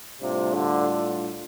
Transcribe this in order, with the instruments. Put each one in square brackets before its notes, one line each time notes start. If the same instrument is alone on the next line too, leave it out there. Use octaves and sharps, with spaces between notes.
[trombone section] A2 G3 D4 F4 [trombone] C3
[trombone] D3